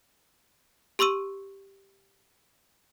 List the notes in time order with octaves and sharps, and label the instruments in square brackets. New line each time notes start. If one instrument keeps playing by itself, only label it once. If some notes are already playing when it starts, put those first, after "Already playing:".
[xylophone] G4 C6 C#6 E6 D#7